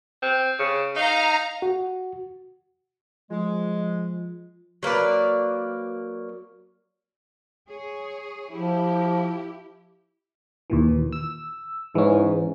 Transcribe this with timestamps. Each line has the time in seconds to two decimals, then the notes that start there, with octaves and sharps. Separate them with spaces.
0.22 C4
0.59 C#3
0.96 D#4 F5 A#5
1.62 F#4
3.31 F3 G#3
4.83 F#3 A#3 B4 D5
7.69 G#4 C#5
8.52 F3 E4 G4
10.70 D#2 A#2 E3
11.12 E6
11.95 G#2 E3 C#4